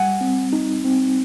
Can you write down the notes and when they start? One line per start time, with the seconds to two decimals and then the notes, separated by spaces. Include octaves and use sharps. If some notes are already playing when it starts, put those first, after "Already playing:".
Already playing: G3 F#5 G#5
0.21 C4
0.53 D#4
0.85 C4